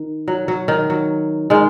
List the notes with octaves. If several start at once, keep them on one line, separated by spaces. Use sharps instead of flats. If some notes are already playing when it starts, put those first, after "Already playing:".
Already playing: D#3
F#3
F#3
D#3
F#3
D#3 G#3